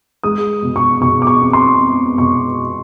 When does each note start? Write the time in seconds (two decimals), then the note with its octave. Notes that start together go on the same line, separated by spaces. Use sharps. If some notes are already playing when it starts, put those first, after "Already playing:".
0.23 G#3 D#6
0.62 B2
0.76 C#6
1.01 B2 C#6
1.22 D6
1.27 C#6
1.41 C4
1.53 C6
1.79 C4
2.18 B2 C#6